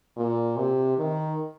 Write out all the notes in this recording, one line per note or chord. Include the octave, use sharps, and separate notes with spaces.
A#2
C3
D#3